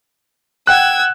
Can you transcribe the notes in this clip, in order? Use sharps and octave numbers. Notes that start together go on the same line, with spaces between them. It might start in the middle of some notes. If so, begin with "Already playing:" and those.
F#5 G5 E6 F#6 G#6